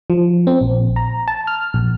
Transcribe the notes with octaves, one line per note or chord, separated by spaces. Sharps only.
F3
C4
A#1
A#5
A5
F6
A#1